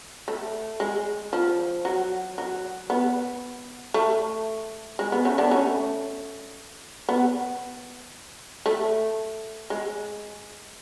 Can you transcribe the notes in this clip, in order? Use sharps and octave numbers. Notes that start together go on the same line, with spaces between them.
A3
G#3
F3
F#3
F#3
B3
A3
G#3
B3
A3 C#4
B3 D4
A3 C#4
B3
A3
G#3